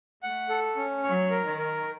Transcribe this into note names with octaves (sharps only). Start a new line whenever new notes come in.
A3 F#5
A4
C#4
F#3 C#5
A#4
D#3
A#4